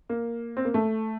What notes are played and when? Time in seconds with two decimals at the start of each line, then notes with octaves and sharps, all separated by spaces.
0.09 A#3
0.57 C4
0.65 A#3
0.74 A3